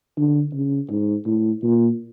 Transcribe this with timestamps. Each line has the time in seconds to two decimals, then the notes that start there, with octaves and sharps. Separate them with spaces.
0.17 D3
0.54 C#3
0.90 G#2
1.26 A2
1.63 A#2